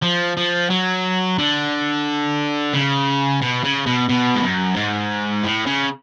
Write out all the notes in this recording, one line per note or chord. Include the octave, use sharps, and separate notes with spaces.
F3
F3
F#3
D3
C#3
B2
C#3
B2
B2
G#2
F#2
G#2
A2
C#3